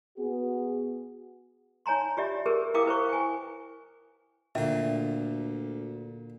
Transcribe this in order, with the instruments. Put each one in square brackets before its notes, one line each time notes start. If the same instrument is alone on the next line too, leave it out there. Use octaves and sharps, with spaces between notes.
[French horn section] B3 F#4 G#4
[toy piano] D#4 C#5 G#5 A#5 C6
F4 G4 D5 E5
G4 G#4 A#4 B4
E4 A#4 F5 G5 D6 D#6
E4 B4 C5 C#6
G5 G#5
[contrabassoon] D2 [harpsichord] A#2 D3 [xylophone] E5 G5